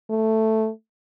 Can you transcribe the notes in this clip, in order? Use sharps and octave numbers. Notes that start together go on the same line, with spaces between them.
A3